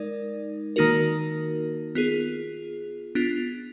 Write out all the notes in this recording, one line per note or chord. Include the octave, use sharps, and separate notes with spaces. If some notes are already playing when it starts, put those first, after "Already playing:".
Already playing: G#3 D#4 A#4 D5
D#3 A#3 D#4 F#4 A#4
B3 F4 G#4
B3 D4 F4